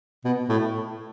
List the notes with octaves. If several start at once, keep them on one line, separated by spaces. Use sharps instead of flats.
B2
A2